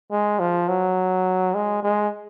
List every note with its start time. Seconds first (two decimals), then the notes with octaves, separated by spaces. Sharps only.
0.12 G#3
0.40 F3
0.69 F#3
1.54 G#3
1.83 G#3